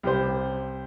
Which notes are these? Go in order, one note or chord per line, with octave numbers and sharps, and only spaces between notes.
C2 G4 C5